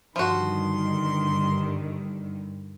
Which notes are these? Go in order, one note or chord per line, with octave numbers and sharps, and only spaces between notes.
G2 D3 D#3 F3 G3 F#4 C6